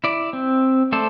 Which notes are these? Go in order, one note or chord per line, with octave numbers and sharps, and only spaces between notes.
E4 D5
C4
A3 A4 C5 D5